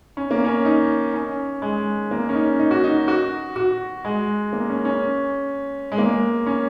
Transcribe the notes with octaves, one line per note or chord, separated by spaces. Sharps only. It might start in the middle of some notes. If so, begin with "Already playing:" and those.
C#4
A#3
C#4
D#4
C#4
G#3
A#3
C#4
D#4
D#4
F#4
D#4
F#4
F#4
G#3
A#3
C#4
C#4
G#3
A#3
C#4